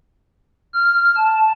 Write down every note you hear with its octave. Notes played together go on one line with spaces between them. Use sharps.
F6
A5